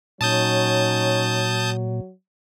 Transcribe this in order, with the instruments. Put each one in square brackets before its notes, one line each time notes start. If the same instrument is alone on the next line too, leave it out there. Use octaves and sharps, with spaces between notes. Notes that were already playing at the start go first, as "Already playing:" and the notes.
[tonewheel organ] A#2 [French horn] F#3 [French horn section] C#4 D#4 C#5 [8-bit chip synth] A5 D#6 G6